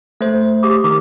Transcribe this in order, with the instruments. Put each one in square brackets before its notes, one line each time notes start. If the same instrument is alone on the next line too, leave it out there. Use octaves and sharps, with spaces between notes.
[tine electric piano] A3 C5
[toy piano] G4 D6 D#6
[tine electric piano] D#3 [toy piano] D6